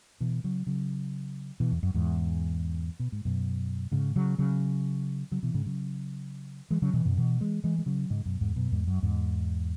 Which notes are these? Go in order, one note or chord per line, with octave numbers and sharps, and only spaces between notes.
B2 E3
C#3 F#3
C#3 F#3
B2 E3
E2
F#2
E2 G#2
B2
G#2
F#2 B2
G#2 C#3
C#3 F#3
C#3 F#3
C#3 F#3
B2 E3
G#2 C#3
C#3 F#3
E3 G#3
C#3 F#3
B2 E3
F#2 B2
B2 E3
E3 G#3
E3 G#3
G#3
C#3 F#3
G#2 C#3
F#2 B2
E2 G#2
F#2 B2
E2 G#2
F#2
E2 G#2